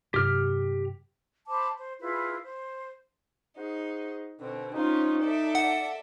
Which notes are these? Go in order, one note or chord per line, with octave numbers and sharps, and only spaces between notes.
G2 C3 F#3 G4 F6
C5 A5 B5 D6
C5
E4 F4 G#4 B4
C5
D#4 F#4 G#4 C5
B2 D3 C4
C4 C#4 D#4 F4
A4 D5 E5
F#5